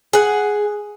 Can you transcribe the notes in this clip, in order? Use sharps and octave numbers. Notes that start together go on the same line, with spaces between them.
G#4 F#5